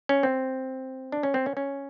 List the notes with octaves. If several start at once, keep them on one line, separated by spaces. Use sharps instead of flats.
C#4
C4
D4
C#4
C4
C#4
C#4